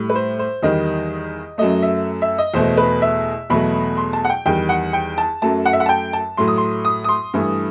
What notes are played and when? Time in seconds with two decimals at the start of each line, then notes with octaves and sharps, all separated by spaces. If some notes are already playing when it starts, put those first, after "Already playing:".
Already playing: A2 G3
0.10 B4
0.15 C5
0.39 C5
0.63 E2 D#3 G3 D#5
1.58 F#2 F#3 A3 D#5
1.82 E5
2.22 E5
2.38 D#5
2.54 E2 B2 A3 C5
2.77 B4
3.02 E5
3.50 E2 B2 F#3 A3 B5
3.97 C6
4.13 A5
4.25 F#5
4.29 G5
4.46 E2 D#3 G3 G5
4.69 F#5
4.93 G5
5.18 A5
5.42 F#2 F#3 A3 A5
5.66 F#5
5.73 E5
5.80 F#5
5.86 A5
5.89 G5
6.13 A5
6.37 A2 F#3 A3 C6
6.48 D#6
6.58 C6
6.85 D#6
7.04 D#6
7.09 C6
7.34 G2 E3 A3